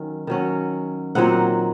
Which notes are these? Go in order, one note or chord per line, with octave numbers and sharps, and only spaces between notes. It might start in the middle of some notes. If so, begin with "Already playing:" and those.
Already playing: D#3 F#3 C#4
D#3 F#3 C#4
A#2 F#3 C4 D#4 F#5